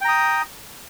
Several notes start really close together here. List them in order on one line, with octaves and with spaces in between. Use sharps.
G5 A#5 D#6